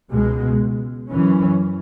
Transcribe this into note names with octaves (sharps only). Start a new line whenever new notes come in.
C#2 B2 G#3
F#2 E3 C#4